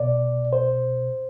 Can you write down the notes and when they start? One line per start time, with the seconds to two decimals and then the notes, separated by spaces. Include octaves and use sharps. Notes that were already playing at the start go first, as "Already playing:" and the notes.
Already playing: C2 B2 D5
0.53 C5